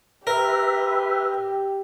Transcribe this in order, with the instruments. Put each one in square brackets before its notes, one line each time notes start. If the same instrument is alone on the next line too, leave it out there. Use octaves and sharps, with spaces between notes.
[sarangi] G4 [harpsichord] A#4 [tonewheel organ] B4 E5